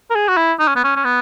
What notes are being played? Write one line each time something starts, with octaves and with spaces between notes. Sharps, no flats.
A#4
G#4
F#4
E4
D#4
C#4
B3
C#4
C#4
B3